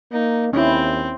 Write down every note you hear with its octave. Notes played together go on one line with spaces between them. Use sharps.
A#3 D#4
D#2 C4 C#4 E4